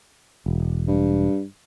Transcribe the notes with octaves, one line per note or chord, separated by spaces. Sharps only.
E1
G2